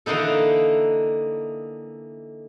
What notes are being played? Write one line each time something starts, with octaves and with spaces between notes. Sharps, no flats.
D3 E3 A#3 D4 D#4 A4